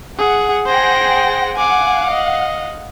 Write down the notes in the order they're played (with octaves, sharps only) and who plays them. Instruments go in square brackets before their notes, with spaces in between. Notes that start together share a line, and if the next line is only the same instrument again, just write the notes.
[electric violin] G#4 [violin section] F#5
[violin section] G#4 F#5 G5 [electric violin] C5 A#6
[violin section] F5 F#5 [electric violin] G#5 D6
[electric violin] D#5